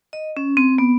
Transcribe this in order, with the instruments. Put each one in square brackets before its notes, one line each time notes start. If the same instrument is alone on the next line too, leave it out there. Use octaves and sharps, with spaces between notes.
[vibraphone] D#5
C#4
C4
B3